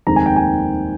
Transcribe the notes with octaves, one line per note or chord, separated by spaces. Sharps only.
F1 D#2 D#3 G#3 C4 A#5
G#5
G5
G#5